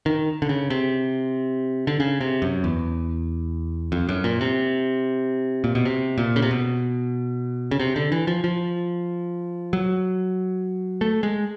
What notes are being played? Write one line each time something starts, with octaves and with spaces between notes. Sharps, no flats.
D#3
D3
C#3
C3
D3
C#3
C3
F#2
E2
F2
F#2
A#2
C3
A#2
B2
C3
A#2
C#3
C3
B2
C#3
C3
D3
E3
F3
F3
F#3
A3
G#3